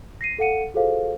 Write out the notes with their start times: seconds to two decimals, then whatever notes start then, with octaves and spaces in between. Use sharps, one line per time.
0.21 A#6 C7 D#7
0.39 A4 F5 F#5 C#7 D#7
0.74 F4 F#4 G#4 A4 C5 F5